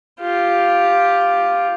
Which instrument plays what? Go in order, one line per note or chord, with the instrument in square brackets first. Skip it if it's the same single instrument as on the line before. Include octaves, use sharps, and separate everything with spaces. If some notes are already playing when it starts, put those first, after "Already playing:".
[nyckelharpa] F4 G4